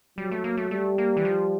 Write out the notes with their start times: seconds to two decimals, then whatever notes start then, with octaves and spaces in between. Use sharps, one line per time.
0.18 F#3 G3
0.32 A3
0.44 A#3
0.57 A3
0.71 G3 A3
0.98 A#3
1.17 E3
1.25 F3